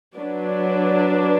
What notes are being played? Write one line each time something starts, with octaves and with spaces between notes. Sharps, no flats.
F#3 D4 B4 D5